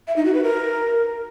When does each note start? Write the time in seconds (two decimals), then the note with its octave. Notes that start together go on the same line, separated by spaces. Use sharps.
0.07 E5
0.16 D#4
0.25 F#4
0.34 B4
0.43 A#4